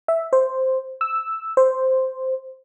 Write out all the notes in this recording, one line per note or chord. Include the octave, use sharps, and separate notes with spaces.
E5
C5
E6
C5